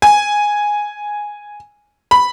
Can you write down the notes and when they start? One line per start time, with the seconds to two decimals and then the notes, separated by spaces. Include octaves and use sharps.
0.02 G#5
2.11 B5